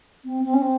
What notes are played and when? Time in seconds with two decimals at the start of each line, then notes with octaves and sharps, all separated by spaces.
0.25 C4
0.44 C4
0.54 C#4
0.61 C4